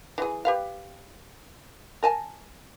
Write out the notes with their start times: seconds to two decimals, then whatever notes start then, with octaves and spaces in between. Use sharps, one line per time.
0.18 E3 G#4
0.45 G4 B4 F5
2.03 A#4 G#5 A5